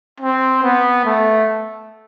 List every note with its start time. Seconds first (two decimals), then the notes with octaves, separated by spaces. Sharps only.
0.20 C4
0.63 B3
1.05 A3